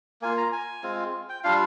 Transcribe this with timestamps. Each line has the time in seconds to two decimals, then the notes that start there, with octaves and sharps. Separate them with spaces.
0.22 A#3 F4 G#5
0.37 A#5
0.52 G#5
0.83 G#3 C4 F4
1.29 G5
1.44 G3 D4 F4 F5